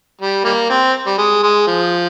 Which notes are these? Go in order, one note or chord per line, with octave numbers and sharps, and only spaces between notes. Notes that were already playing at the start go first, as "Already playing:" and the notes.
G3
G3 A#3
C4
G3
G#3
G#3
F3